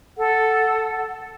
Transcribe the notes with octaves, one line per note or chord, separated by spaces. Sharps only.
A4 F#5